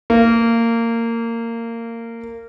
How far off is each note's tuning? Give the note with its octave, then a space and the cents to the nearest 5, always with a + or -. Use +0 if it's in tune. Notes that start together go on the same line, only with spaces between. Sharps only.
A#3 -20